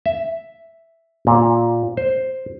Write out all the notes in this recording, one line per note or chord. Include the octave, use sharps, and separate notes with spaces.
E5
A#2
C5